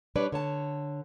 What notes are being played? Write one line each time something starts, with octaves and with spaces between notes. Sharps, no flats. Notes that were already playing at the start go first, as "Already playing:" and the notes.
G3 D4 B4 C#5 D5
D3 C#5 A5